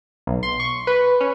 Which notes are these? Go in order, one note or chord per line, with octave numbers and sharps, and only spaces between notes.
B1
C6
C#6
B4
C#4